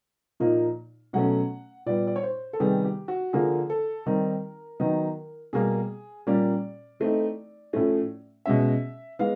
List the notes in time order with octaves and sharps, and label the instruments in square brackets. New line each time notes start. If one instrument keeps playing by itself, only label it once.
[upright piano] A#2 F3 A#3 D#4
B2 F#3 A3 C#4 F#5
A#2 G3 B3 D5
D5
C#5
C5
A4
C3 D#3 G3 B3 G#4
G4
F#4
D3 F3 A#3 G#4
A4
D#3 G3 C4 D#4 A#4
D#3 F#3 B3 D#4
B2 G3 A#3 G#4
A#2 G3 A#3 C#4 D5
E3 A3 C4 D#4
A2 F3 A3 C#4
B2 G#3 C#4 E5
E3 G#3 B3 F5